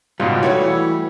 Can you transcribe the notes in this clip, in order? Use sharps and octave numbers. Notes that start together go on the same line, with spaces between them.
C#2 G#2 B2 G3 F4
E3 G3 A3 F#4 C#5
E3